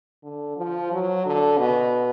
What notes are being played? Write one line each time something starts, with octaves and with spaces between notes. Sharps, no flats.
D3
F3
F#3
D3
B2